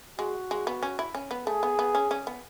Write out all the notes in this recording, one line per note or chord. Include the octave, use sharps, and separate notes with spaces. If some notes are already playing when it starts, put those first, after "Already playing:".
G#3 F#4
G#3
B3
C#4
E4
C#4
B3
A3 G#4
B3
B3
C#4
C#4
B3